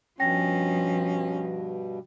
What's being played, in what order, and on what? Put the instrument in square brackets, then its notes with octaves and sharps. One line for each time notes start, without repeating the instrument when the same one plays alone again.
[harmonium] G2 B2 [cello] F3 [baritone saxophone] C#4 [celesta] G5 A#6